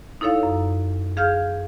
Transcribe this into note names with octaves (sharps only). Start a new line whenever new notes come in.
D#4 E4 A4 C#5 F5
F#2
G#4 F5 F6 G6 G#6